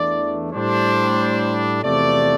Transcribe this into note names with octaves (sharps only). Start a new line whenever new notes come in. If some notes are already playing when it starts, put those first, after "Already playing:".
Already playing: E2 E3 A3 D4 D5
A2 G3 D4 C5
E2 C3 F3 A3 D5